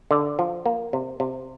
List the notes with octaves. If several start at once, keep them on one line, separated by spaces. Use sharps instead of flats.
D3
F3
A#3
C3
C3